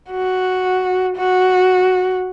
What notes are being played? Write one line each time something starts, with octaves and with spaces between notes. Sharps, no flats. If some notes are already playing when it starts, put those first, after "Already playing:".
F#4
F#4